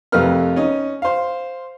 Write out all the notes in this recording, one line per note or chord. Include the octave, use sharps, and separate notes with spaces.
F2 C3 A3 A#4 B4 F6
C#4 D#4
C5 F5